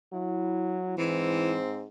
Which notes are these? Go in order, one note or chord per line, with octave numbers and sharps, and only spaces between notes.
F#3 E4
G#2 E3 C4